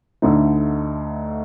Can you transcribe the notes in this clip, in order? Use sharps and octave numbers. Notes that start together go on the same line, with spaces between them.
D2 D3 A3 D#4